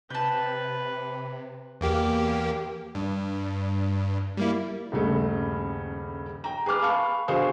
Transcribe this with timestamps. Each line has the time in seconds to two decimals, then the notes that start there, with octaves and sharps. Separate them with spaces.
0.10 C3 B4 G5 A5
1.81 E2 A#3 G4
2.95 G2
4.37 G3 A#3 E4
4.92 D#1 G2 C#3 A3
6.44 G5 A#5
6.66 G#4 B4 D6 F6
6.82 F5 A5 B5 C#6 F6
7.28 B2 D3 G#4 C5 F5 C#6